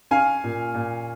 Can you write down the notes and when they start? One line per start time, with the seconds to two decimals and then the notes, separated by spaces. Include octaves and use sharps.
0.11 C#4 F5 G#5
0.44 A#2
0.75 A#2